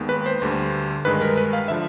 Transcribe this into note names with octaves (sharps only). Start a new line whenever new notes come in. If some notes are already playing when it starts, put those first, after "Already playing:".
Already playing: D#2 D#3 G#3 B3
B4
C5
D2 D3 G3
G2 D#3 G#3 B4
A#4
B4
F5
D3 F3 E5